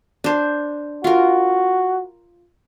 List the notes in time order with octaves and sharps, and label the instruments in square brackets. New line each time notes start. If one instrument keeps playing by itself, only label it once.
[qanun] D4 C5
[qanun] F4 A#4 [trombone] F#4